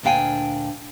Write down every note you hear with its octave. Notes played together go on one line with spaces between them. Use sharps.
D2 A#2 D4 F5 G5 G#5